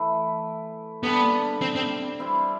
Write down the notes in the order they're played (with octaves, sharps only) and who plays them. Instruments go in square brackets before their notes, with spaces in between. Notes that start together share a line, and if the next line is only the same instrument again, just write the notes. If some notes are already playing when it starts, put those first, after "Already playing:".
Already playing: [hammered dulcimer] E3 A3 E4
[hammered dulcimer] D3 G3 D4 [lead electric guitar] B3
[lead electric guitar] C4
C4
[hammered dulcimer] G3 C4 E4 B4